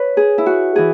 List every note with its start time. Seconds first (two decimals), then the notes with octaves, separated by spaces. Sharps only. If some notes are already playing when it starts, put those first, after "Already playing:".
Already playing: B4 C#5
0.17 G#4
0.38 E4
0.46 F#4
0.76 E3 G#4